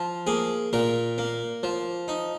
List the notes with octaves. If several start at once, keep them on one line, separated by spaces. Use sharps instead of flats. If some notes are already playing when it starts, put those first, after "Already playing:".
Already playing: F3
A#3 G#4
A#2 A#4
A#3
F3
D#4